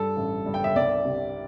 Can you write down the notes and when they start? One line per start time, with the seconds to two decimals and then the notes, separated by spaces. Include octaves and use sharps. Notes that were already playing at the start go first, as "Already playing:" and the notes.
Already playing: G2 A4
0.17 A1
0.46 G2
0.54 G5
0.64 E5
0.76 C2 D5
1.05 C3